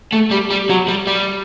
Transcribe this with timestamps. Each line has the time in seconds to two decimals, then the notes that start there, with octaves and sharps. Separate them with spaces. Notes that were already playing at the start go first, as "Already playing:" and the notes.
0.13 A3
0.31 G3
0.50 G3
0.70 F#3
0.88 G3
1.07 G3